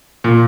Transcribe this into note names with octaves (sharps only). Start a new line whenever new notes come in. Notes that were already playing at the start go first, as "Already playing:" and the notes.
A#2